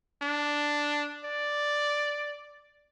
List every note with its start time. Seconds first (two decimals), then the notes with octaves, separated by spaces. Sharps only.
0.22 D4
1.25 D5